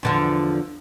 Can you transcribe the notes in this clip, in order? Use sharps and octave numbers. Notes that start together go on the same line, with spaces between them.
E2 D3 F3